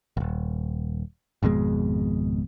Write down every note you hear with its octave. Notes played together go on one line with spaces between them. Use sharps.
D#1 G#1
G#1 F2 B2 G#3